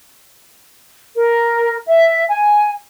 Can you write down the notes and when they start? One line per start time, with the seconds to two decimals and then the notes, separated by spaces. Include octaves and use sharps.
1.17 A#4
1.86 E5
2.28 G#5